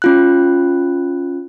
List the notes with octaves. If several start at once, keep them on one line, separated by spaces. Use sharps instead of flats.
C#4 F4 F#6